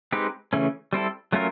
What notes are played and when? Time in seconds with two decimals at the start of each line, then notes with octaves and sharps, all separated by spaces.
0.12 G#3 C4 D#4 G4 B4
0.53 C#3 E3 A3 C#4
0.93 G3 C4 E4 A4
1.32 F#3 A3 C#4 F4 A#4